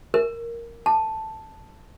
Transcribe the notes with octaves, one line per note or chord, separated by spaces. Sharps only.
A#4
A5